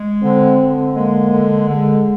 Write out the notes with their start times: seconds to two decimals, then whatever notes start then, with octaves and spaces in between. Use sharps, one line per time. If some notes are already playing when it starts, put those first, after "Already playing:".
Already playing: G#3
0.23 D3 C4
0.59 D3
0.94 G#3 A#3
1.31 D3
1.67 D3 G#3